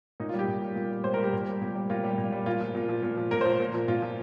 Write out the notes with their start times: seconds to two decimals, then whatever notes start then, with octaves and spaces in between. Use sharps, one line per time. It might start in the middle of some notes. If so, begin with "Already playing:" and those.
0.20 A#2 D#4
0.29 F4
0.34 G3
0.39 G4
0.48 A#2
0.62 G3
0.76 A#2
0.91 G3
1.04 A#2 C5
1.14 A#4
1.18 G3
1.24 G4
1.33 A#2
1.47 G3
1.61 A#2
1.75 G3
1.90 A#2 F4
2.04 G3
2.18 A#2
2.32 G3
2.46 A#2 F4
2.60 F3
2.75 A#2
2.89 F3
3.03 A#2
3.17 F3
3.31 A#2 A#4
3.41 C5
3.45 F3
3.60 A#2
3.74 F3
3.88 A#2 F4
4.02 F3